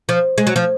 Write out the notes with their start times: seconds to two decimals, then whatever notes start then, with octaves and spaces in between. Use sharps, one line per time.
0.09 F3
0.38 G#3
0.47 F#3
0.56 F3